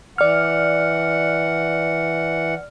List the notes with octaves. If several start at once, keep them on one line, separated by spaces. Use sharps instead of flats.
E3 D5 F#5 F6